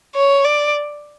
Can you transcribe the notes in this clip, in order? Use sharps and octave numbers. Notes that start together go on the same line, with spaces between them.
C#5
D5